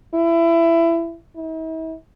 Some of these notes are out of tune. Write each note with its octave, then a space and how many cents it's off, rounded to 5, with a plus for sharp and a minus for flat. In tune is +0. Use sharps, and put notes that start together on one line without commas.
E4 +20
E4 -45